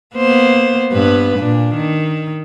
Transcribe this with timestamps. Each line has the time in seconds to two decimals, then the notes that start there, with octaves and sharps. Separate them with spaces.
0.16 A#3 B3 C5
0.92 G2 B3 B4
1.39 A#2 D4
1.76 D#3